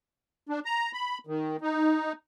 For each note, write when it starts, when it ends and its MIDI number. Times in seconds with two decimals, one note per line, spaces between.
0.49 0.60 62
0.65 0.91 82
0.93 1.18 83
1.27 1.57 51
1.62 2.12 63